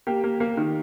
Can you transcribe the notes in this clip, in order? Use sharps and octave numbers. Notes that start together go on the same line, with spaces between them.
A#3 G4
A#3
A#3
D#3